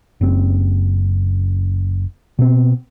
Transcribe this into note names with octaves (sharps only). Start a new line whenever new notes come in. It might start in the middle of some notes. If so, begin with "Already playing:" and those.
F#1 C4
B2 C4